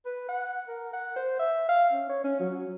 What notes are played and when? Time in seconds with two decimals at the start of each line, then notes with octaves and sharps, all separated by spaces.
0.06 B4
0.29 F#5
0.68 A#4
0.93 F#5
1.16 C5
1.40 E5
1.69 F5
1.93 C#4
2.10 C#5
2.25 C#4
2.40 F#3